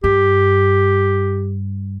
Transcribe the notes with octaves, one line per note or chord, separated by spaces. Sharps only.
G2 G4